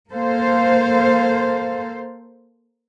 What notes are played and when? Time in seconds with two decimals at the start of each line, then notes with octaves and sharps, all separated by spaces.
0.11 A#3 A4 C5 F5